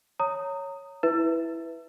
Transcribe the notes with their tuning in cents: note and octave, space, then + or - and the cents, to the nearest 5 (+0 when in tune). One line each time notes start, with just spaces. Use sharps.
C#5 +0 A#5 -25 D#6 +0
E4 +0 B4 +0 E5 +0